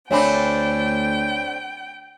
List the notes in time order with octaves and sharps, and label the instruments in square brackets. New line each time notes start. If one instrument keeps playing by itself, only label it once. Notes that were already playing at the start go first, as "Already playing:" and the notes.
[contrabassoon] D2 [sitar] A3 C4 D4 [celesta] C#5 G#5 B5 [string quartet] G5